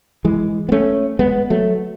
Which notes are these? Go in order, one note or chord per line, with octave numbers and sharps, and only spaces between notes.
E3 G#3
B3
A3 C#4
G#3 B3
F#3 A3